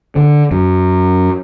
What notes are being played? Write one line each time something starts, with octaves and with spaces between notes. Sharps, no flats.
D3
F#2